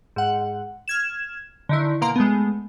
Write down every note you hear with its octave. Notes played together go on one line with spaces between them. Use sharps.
G#2 F#5
F6 G#6 E7
D3 D#3 E4
B2 A#3 F5 A#5 C6 D7
G#3 A3 B3